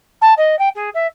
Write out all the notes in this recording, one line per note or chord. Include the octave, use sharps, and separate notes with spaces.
A5
D#5
G5
G#4
E5